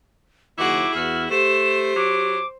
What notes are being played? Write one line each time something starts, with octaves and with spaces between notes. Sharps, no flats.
F#1 D#2 E4 F#4 G#4 D6
E2 F#4 F6
A3 G4 C5 E7
F#3 D6